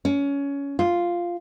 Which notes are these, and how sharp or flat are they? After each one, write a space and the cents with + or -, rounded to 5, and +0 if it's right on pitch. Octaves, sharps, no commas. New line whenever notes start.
C#4 +20
F4 -5